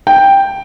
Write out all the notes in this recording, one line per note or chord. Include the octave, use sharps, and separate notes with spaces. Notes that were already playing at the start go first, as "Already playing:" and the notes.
G5